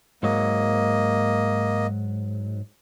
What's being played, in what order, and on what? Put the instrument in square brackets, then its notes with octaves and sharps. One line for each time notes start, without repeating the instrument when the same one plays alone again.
[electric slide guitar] G#2 F#3 [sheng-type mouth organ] A#3 D#5